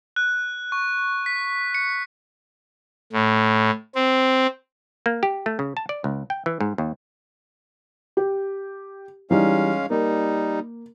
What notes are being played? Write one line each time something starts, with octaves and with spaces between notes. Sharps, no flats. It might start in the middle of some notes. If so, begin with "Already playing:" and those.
F#6
C#6
B6
C#7
A2
C4
A#3
G4
A3
C#3
A5
D5
C#2
G5
E3
G#2
D#2
G4
E3 G3 G#3 C#4 D#4 F5
G3 A#3 D#4